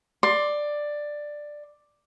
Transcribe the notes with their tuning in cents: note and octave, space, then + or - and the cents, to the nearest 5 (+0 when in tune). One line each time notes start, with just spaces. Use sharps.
D5 +10 C6 +15